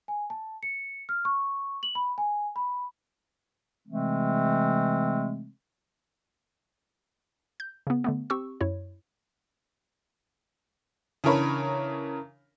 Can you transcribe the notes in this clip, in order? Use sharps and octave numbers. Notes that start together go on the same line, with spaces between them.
G#5
A5
C#7
F6
C#6
F#7
B5
G#5
B5
C3 E3 G#3 A3 C4
G6
C#3 B3
D3 A3 B3
C4 G4 C#6 E6
F#2 E4 C#5
C#3 E3 D4 A#4 C#5 B5